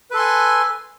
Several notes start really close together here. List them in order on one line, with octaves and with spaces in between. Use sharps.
B4 A4 C6 G#5